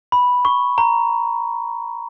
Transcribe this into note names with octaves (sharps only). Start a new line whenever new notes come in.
B5
C#6
A#5